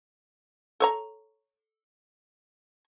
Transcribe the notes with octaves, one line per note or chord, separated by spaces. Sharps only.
A4 C#5 A#5